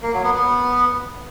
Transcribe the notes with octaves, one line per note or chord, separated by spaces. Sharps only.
A#3
F#3
B3
B3